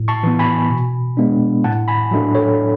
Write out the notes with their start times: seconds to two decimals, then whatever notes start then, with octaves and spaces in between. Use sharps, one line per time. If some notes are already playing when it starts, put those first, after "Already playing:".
Already playing: A2
0.08 A5 C#6
0.23 E3 B3
0.39 G#5 B5
0.70 B2
1.17 G#3 B3 D4
1.64 A2 F#5 A5
1.88 G#5 B5
2.11 F#3 A3 D4
2.35 A4 C#5